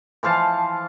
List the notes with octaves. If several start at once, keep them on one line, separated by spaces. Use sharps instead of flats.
E3 F3 F5 A5